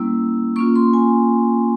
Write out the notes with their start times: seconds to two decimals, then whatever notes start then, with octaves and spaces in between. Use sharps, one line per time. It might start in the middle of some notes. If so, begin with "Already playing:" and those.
Already playing: G3 A#3 C#4 E4 E6
0.56 A#3 C#4 F4 C#6
0.75 C6
0.94 G#5